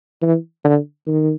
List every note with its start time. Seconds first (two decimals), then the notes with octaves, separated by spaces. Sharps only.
0.22 E3
0.65 D3
1.07 D#3